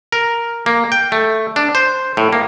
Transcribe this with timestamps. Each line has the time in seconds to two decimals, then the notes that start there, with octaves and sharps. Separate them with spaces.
0.12 A#4
0.66 A#3
0.92 G5
1.12 A3
1.56 D4
1.75 C5
2.17 A2
2.33 A#3